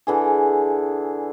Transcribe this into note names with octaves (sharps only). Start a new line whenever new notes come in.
D3 E3 G#4